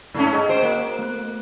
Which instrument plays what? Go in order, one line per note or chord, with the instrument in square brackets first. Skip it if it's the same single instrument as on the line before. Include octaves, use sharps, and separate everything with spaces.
[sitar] G#2 A3 C#4
[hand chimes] G#4 D#5 G5
[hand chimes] F#4 D7 [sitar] C5
[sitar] A#3
[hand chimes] A3 B3 F#6